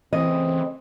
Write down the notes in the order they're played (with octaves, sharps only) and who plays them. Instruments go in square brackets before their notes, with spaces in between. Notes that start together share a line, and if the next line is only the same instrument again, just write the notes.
[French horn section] C#3 A3 C4 [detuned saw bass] E3 [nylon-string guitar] D#5